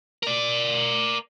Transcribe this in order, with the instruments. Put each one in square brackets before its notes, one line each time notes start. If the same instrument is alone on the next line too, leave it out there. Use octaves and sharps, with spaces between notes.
[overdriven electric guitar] A#4 D5